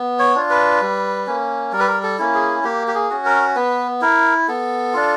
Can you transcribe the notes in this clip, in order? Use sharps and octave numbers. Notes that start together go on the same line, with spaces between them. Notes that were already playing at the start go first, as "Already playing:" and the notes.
Already playing: B3
C#5
D4 F4
B4
G3
A#3 C#4
G3 A#4
B4
A#4
A4
A#3 C#4 E4
G#4
A#3 G4
G4
G#4
C#4 F#4
A#4
B3 B4
E4 A#4
B3 A4
D4 F4